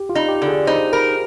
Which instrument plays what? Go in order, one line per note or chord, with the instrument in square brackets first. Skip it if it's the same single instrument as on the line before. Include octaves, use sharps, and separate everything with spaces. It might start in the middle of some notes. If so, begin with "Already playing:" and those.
Already playing: [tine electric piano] G4
F4
[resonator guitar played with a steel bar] D#4
[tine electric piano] G4
[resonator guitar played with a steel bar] D3
[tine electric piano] G#4
[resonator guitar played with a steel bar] D#4 [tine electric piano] C5
[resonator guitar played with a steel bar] A#4